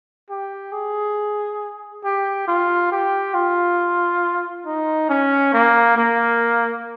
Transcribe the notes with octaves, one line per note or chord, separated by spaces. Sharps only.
G4
G#4
G4
F4
G4
F4
D#4
C#4
A#3
A#3